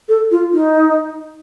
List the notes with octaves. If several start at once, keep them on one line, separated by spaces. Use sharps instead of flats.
A4
F4
D#4